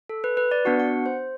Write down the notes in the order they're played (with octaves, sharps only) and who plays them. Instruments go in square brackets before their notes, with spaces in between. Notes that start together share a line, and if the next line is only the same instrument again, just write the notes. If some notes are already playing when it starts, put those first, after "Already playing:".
[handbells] A4
B4
B4
D5
B3 D4 F#4 F#5
F#5
C5